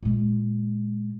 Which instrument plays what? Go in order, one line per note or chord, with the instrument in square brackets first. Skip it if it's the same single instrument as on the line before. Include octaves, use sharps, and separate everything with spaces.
[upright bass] A#2 G#3